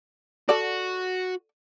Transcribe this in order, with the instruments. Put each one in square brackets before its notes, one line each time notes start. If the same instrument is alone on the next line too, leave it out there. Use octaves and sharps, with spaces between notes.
[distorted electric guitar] F#4 [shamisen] A4 D5